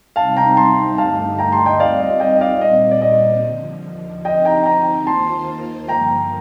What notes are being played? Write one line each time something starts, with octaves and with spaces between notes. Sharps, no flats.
C3 G3 C4 D#4 F5 A5
G5 A#5
A5 C6
G2 D3 A3 D#4 G4 F5 A5
G5 A#5
A5 C6
D#5 G5
G3 C4 F4 D5 F5
D#5
D#5 G5
D#5
D5 F5
A#2 G3 C4 D#5
D5
D#5
D#2 D3 F3
D3 F3 C4 D#4 G4 D#5 G5
G5 A#5
G5 A#5
D#2 D#3 A#3 F4 C5 A5 C6
G2 D3 F3 A#3 G5 A#5